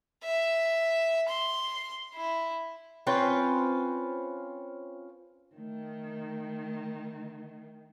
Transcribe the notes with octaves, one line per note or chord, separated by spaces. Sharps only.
E5
C6
E4
C4 C#4 F4 B4
D#3 A3